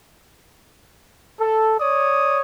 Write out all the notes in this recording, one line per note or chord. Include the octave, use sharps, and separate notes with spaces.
A4
C#5 D5 D#6